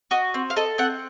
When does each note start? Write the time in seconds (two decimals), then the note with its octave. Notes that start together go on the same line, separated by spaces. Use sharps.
0.11 F#4 D#5
0.34 C4
0.50 F5
0.57 A4 D#5
0.78 C4 F#5